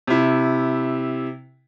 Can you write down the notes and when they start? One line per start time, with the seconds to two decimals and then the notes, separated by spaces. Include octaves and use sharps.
0.07 C3 E4